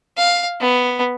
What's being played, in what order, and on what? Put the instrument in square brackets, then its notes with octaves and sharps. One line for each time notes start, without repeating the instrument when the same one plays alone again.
[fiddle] F5
B3